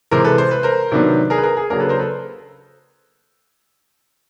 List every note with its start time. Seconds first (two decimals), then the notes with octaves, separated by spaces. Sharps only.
0.11 C3 E3 G#3 A#4 C5
0.24 A4 B4
0.38 C5
0.51 B4
0.63 A#4 C5
0.92 C3 D#3 F#3 B3 D4
1.30 G#4 A#4
1.38 B4
1.43 G#4 A#4
1.57 G#4
1.70 C#3 F#3 A#3 D4 G#4 A#4
1.80 A4 B4
1.89 A#4 C5
1.99 A4 B4